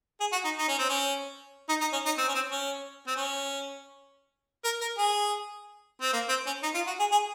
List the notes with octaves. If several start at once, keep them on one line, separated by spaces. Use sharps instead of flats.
G#4
F#4
D#4
D#4
C#4
C4
C#4
D#4
D#4
C#4
D#4
C4
C#4
C4
C#4
C4
C#4
A#4
A#4
G#4
C4
A#3
C4
C#4
D#4
F4
F#4
G#4
G#4